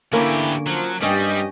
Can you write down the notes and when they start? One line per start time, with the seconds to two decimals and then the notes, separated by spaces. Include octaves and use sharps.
0.13 D3 E3 A3 A#3 C#4 E4 G4
0.67 F3 F#3
1.02 G2 G3 C#4 G4 D#5